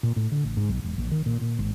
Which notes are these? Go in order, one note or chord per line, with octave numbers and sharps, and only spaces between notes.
A#2
A2
D3
A1
G#2
B1
E1
A#1
D#3
A#2
A#2
G#1